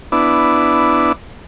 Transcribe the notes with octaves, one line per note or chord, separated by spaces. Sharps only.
B3 D4 E4